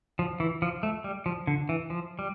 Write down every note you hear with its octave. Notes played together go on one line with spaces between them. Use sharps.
F3
E3
F3
A3
G3
F3
D3
E3
F3
G3